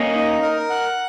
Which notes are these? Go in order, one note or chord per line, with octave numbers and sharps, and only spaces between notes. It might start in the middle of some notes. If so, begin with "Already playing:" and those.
Already playing: A#3 C#4 D#5
D#4
A#4
F#5